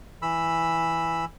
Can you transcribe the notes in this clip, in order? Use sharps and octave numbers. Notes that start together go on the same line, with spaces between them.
E3 B5 E6